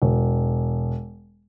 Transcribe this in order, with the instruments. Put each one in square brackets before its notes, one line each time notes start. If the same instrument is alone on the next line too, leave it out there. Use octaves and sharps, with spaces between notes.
[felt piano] E1